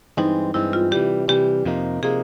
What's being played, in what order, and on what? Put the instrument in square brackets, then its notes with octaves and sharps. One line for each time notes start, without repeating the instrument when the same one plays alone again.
[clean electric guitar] G2 E3 G#3 C4 [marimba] D#4
[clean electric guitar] G2 E3 G#3 C4 [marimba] E4
[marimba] F4
[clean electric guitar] C3 E3 G3 [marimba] G4
[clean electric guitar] C3 E3 G3 [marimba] G4
[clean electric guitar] F2 C3 F3 A#3 D#4
[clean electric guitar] C3 F3 A#3 D#4 [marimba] G#4